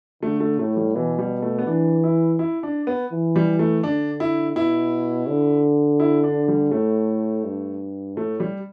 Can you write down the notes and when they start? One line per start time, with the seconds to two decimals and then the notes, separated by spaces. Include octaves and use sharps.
0.23 D3 A3
0.40 A3
0.59 A2 A3
0.77 G3
0.95 B2 E3
1.19 G3
1.43 A3
1.59 B3
1.67 E3 D4
2.04 E4
2.39 E4
2.63 D4
2.87 B3
3.12 E3
3.36 G3
3.59 A3
3.83 D3 D4
4.20 E4
4.55 B2 E4
5.28 D3
6.00 E4
6.24 D4
6.48 G3
6.72 A2 A3
7.44 G2
8.16 A2 A3
8.40 G3